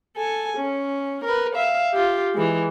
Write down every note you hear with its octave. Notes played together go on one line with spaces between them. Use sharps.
A4 G#5
C#4
A#4 B4
E5 F5
F4 G4
E3 G#3